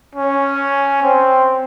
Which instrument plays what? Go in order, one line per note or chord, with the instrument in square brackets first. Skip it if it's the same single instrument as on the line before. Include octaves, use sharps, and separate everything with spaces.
[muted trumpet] C#4
C4